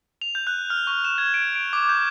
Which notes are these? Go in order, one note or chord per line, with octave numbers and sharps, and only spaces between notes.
F7
G6
F#6
F6
C#6
E7
G#6
D7
D7
D6
G6